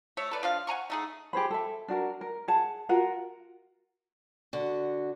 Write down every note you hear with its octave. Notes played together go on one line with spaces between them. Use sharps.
A3 C#5 E5
A4 B4 D5
F3 D4 F5
F#5 G#5 A#5 C#6
A3 D#4 G#4
G4 G#4 C5 B5
A4 E5
D4 F#4 A#4
A#4
G#4 F#5 A5
F4 F#4 A#4 F#5
D3 F#4